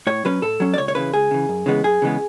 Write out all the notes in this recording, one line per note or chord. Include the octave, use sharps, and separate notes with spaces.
A2 C#5
F#3 C#4 B4
A2 A4
F#3 C#4
D5
C#2 C#5
C#5
C#3 E3 B4
C#2 G#4
C#3 E3
F#2
C#3 E3 G#3 B3
F#2 G#4
C#3 E3 G#3 B3